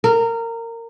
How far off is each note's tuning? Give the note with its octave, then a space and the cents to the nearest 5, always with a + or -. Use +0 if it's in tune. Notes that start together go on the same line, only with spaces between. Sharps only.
A#4 -20